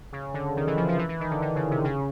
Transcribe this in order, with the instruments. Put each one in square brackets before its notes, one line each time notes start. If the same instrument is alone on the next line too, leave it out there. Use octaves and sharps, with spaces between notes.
[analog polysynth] C#3
D3
D#3
E3
F3
F3
E3
E3
D#3
D3
D3
C#3
C3
C#3